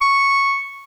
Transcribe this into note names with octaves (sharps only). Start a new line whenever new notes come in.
C#6